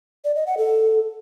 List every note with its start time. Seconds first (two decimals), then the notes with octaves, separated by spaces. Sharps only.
0.25 D5
0.36 D#5
0.47 F#5
0.58 A4